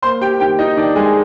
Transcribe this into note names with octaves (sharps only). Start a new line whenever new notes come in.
A#3 C5 C6
G4 G5
D#3 G4 G5
D#4 D#5
D#3 D4 D5
G#3 G#4